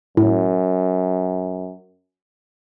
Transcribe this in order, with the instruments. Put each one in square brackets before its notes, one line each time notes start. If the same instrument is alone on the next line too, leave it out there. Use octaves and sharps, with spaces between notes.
[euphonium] F#2 [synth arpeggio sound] A2